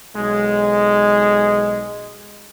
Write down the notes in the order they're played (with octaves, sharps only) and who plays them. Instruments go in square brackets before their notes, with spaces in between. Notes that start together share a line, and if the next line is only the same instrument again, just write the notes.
[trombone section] B1 G#3